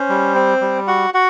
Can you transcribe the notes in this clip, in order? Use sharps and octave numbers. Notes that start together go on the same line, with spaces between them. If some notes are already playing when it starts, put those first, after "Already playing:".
Already playing: C#4 C5
G3
C4
G3
F#4 F#5
F#4 F#5